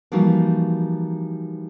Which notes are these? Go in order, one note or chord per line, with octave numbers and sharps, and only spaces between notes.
E3 F3 G3 A#3 D#4 F#4